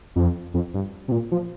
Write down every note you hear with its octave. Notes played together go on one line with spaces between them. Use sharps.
F2
F2
G2
C3
A#2
F3